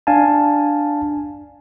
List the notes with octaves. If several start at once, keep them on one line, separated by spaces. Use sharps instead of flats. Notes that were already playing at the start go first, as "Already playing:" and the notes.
D4 F5 G#5 A5